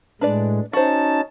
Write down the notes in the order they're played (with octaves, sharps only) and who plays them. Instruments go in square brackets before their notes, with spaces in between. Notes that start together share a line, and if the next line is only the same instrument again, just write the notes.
[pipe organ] A2 G#3 [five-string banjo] D4 B4 D5
[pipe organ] C#4 D#4 A5 [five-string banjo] F#4 C5